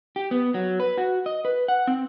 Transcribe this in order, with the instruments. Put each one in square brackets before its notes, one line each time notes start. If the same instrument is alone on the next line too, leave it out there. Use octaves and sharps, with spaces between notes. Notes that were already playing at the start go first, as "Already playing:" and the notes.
[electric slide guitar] G4
B3
F#3
B4
F#4
D#5
B4
F#5
C4